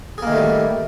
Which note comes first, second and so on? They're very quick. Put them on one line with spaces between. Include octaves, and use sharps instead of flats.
G#4 A#3 D#3 A3 G3